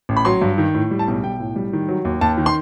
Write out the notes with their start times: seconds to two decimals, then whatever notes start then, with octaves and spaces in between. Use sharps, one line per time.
0.09 A1
0.17 B5
0.25 F#3 C6
0.42 G2
0.58 D#3
0.75 A2
0.91 G3
0.99 A5
1.08 B1
1.23 B1 G5
1.40 A2
1.56 G3
1.73 D#3
1.89 F#3
2.05 D#2
2.21 D#2 A5
2.38 D#3
2.46 C6